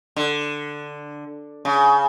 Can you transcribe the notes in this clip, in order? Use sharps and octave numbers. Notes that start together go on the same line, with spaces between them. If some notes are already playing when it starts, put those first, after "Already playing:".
D3
C#3